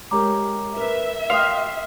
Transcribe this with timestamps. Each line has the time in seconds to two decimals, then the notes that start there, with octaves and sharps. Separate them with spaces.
0.11 G#3 G4 A#4 C#5 A#5 D6
0.77 A#4 B4 E5
1.30 F#4 A#4 F5 G5 C6 D#6